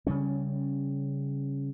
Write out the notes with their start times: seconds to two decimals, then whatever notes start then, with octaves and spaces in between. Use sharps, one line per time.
0.07 C#3 G3 C#4